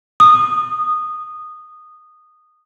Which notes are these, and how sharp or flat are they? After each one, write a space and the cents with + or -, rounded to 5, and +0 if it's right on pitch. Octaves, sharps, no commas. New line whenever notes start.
D#6 -15